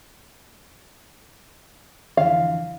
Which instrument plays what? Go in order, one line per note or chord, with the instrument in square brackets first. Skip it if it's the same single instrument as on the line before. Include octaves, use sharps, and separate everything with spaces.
[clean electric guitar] F2 D3 E3 [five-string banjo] F5